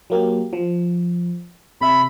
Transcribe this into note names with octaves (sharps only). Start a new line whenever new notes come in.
F#3 A#3 G4
F3
C3 E5 B5